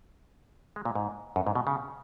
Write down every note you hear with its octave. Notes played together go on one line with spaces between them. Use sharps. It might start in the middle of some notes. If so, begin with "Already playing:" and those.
G#3
A#2
G#2
F#2
G#2
B2
C#3